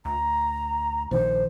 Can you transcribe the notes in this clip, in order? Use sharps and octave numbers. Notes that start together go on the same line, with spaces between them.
D2 A#5
A#1 D#3 C5